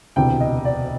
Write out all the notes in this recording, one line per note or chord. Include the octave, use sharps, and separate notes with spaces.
E1 D2 C3 E3 G5
D#5
D5